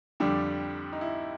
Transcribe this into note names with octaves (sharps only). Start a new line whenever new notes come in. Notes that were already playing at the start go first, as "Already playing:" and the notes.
F2 D3 G3 D4
D#4
E4